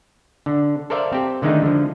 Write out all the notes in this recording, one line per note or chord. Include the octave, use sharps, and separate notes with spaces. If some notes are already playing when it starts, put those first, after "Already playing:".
D3
A4 A#4 C5 D5 E5 F5
C4 G4
D3 D#3 G#3 A3 D#4
D3 F3